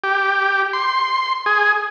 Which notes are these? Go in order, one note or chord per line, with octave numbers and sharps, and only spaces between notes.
G4
C6
G#4